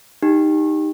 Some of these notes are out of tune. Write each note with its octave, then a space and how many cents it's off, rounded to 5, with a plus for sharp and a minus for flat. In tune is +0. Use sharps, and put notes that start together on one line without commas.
D#4 +0 G4 +10